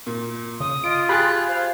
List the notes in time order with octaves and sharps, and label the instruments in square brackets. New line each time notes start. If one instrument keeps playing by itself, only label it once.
[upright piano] A#2
[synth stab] C#3 [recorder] D#6
[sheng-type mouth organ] F4 [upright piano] D#5 [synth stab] D7
[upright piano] G4 G#4 [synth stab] B5 C6 A6 [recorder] F#6
[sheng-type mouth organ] F4 C5 [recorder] F5